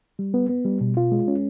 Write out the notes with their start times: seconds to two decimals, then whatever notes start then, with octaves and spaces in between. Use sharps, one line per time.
0.19 G3
0.34 B3
0.49 B3
0.65 G3
0.81 B2
0.97 F4
1.12 G#3
1.28 C#4